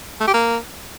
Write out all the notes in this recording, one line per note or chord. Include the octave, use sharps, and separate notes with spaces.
A3
G4
A#3